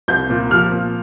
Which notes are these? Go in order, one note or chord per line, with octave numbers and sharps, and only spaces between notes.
C2 G6
A#2
F3 F6
A#2